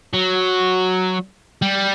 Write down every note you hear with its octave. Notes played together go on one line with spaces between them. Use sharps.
F#3
G3